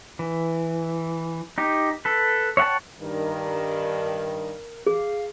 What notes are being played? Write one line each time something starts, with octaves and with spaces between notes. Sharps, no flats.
E3
D#4 G4
A4 B4
C#5 E5 F#5 G5 A5
G2 D#3 A#4
G#4 F5